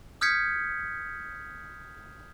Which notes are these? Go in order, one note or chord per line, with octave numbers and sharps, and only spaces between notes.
D#6 F6 G6 G#6 B6 C#7